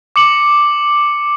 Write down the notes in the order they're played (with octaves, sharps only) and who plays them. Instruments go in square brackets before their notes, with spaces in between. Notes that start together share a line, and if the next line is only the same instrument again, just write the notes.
[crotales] D6 C#7 F#7